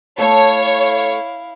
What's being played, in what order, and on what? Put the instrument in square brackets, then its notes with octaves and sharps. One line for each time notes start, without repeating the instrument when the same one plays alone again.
[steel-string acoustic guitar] A3 A4 A5 [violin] E4 F5 [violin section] C#5